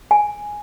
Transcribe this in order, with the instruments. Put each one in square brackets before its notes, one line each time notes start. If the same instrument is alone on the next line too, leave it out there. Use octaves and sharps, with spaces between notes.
[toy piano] G#5